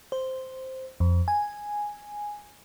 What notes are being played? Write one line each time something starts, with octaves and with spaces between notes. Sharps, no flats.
C5
F2
G#5